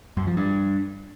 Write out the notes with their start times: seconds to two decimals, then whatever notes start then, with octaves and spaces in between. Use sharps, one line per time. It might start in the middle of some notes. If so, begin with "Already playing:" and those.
0.17 F#2
0.27 F3
0.37 G2